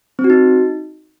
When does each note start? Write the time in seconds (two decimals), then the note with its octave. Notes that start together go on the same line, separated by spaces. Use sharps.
0.19 C4
0.24 F#4
0.30 D#4